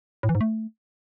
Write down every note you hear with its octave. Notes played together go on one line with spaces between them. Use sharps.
A2
E3
G#2
A3